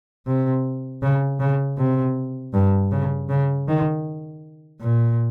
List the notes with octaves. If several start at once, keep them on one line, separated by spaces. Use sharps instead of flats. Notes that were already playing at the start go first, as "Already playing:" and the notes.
C3
C#3
C#3
C3
G2
C#3
C#3
D#3
A#2